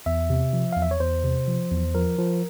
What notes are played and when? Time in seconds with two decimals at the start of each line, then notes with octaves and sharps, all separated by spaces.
0.06 E2 E5
0.30 C3
0.53 F3
0.72 F5
0.77 E2
0.82 E5
0.91 C#5
1.00 E2 C5
1.23 C3
1.48 F3
1.71 E2
1.95 F3 A#4
2.19 F3